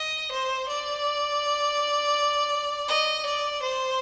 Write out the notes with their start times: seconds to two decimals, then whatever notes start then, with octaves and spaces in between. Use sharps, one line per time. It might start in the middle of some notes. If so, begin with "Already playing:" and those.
Already playing: D#5
0.31 C5
0.68 D5
2.88 D#5
3.25 D5
3.62 C5